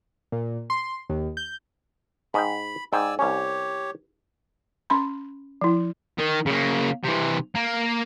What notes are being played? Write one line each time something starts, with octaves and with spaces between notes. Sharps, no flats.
A#2
C6
D#2
G6
G#2 D#5 G5 B5
G#2 D5 G5 G#5 E6
C2 C#4 G4 C#5
C#4 B5 C6
F3 E4
D#3
C#3 A#3
C3 E3
A#3